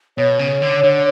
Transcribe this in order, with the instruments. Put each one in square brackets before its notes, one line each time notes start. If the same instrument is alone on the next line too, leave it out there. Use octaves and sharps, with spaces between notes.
[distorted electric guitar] B2 [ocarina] C#5
[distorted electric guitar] C#3
D3
D3